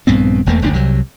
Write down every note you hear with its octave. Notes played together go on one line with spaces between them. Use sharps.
A#1 G2 B3 C4
E1 E2 A3 A#3
F1 D2 C#4 D4
C2 C3 F#3